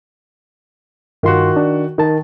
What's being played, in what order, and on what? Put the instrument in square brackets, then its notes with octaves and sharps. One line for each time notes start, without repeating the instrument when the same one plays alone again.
[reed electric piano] G2 F4 C6 [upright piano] D#3 F#4
[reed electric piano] D4
[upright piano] D#3 [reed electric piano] D#4 A5